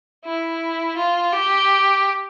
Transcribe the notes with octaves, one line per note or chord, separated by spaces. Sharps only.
E4
F4
G4